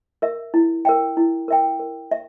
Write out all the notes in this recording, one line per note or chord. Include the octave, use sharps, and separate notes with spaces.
A#4 E5
E4
A#4 E5 G5
E4
A#4 E5 G5
A#4
E5